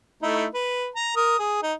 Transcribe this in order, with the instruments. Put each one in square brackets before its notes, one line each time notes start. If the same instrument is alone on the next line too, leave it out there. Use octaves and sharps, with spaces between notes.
[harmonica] A3 D#4 E4
B4
A#5
A#4 D#6
G#4
D#4